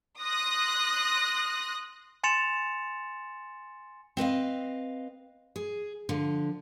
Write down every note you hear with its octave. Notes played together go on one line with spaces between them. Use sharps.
C6 D#6 F#6 A#6
G#5 C6 A6 C#7 E7 F7
C4 B4 D#5 F5
G#4
D3 F3